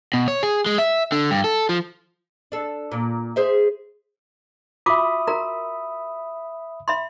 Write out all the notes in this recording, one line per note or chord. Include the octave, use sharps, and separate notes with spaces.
B2
C#5
G#4
G#3
E5
D3
G2
A4
F3
D4 A4
A#2
G#4 C5 E5
F4 F#4 E5 B5 D6 D#6
F#4 A#4 A#5
E5 B5 C6